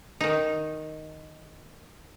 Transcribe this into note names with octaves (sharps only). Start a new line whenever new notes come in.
D#3 D#4